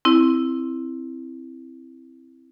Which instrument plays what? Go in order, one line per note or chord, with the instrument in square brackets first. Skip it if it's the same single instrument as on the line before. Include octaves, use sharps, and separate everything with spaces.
[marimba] C4 E4